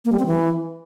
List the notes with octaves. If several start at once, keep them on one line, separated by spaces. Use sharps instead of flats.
A#3
G3
C4
E3